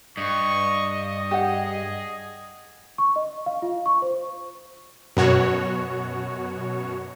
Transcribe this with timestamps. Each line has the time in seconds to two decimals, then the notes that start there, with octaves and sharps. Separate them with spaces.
0.17 G2 D#5 C#6
1.31 G4 G#4 F#5
2.98 C#6
3.16 D#5
3.46 F5
3.62 F4
3.86 C#6
4.02 C5
5.17 F#2 B2 F#4 C#5